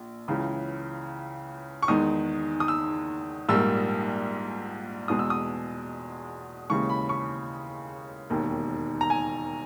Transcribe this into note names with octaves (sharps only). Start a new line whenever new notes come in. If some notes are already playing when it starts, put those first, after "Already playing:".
Already playing: A#1
C#2 C#3 E3
C#6
E2 D#3 G#3 D#4 D#6
D#6
E6
A#1 G#2 G3 A#3 E6
E2 B2 G#3 D#6
E6
D#6
D#2 C#3 E3 G#3 C#6
B5
C#6
E1 D#2 D#3
A#5
G#5